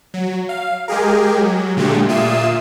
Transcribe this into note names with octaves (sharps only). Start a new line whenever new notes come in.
F#3
F5
G#3 G4 G#4 A#4
F#3
A#2 D3 G#3 A3 G4
A#2 F4 E5 D#6 C7 E7